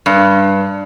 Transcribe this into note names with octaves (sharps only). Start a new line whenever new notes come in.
G2